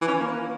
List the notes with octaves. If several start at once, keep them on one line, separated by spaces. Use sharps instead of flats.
E3
C#4
E3
A#3